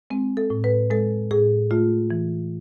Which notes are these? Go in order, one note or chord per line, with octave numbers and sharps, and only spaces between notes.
G#3 C4
A4
A2
B4
G#3 A4
A2 G#4
A3 F4
E3